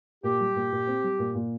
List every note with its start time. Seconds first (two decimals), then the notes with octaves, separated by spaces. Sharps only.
0.23 A#2 G4
0.40 G3
0.56 A#2
0.72 A#2
0.87 C4
1.04 G3
1.19 A#2
1.35 A#2